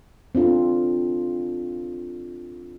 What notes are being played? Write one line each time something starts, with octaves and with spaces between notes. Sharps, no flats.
C4 D4 F4 A4